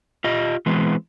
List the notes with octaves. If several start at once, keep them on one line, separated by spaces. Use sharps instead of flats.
F4 G4 D#5
E3 G#3 B3 C4